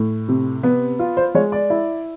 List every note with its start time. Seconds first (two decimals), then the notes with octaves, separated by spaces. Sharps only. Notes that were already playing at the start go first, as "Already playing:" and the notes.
Already playing: A2
0.28 C3
0.63 B3
0.99 F4
1.17 C5
1.35 G#3 C#5
1.52 D5
1.70 E4